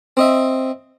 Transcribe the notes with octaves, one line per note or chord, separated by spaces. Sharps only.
C4 D#5 E5